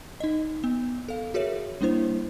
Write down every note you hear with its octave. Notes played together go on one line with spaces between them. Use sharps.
D#4 D#5
B3
A4 F5
F#4 G#4 A#4 C#5 E5
G3 A#3 D4 E4 C5